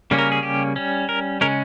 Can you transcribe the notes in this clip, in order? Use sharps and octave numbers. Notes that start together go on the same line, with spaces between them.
C#3 G3 A#3 C#4
A#4
G#4
G4
G3 C#4
A#4
C#3 G#3 C#4 A#4